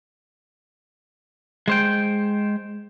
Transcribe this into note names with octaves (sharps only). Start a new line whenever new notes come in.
G#3 C5 G5